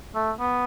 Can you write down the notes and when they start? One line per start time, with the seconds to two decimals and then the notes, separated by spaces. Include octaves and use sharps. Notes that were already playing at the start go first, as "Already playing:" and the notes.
0.15 A3
0.40 B3